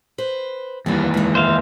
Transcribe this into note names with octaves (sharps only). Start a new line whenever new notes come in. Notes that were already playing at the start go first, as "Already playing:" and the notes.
B4 C5
D#2 E3 G3 B3
G#3 D#4
C5 E5 F5